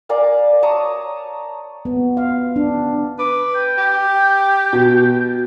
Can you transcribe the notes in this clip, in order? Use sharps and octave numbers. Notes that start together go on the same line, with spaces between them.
A#4 D5 F5 G#5
C#5 A5 A#5 D#6
B3
F5
D4
B4 D6
G5
G4
B2